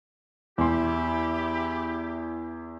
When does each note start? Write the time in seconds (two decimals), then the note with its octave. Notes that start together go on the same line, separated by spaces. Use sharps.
0.58 E2 E4 G4 C6